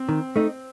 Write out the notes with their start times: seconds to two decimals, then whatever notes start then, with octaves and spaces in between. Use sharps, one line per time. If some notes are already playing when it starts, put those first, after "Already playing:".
Already playing: C4
0.09 D#3
0.36 A3 D#4